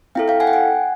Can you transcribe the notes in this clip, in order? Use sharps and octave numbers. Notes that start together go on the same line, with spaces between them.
C4 E4 A4 F5 G5
F5 G5
F#5 G#5
G5
F#5 G#5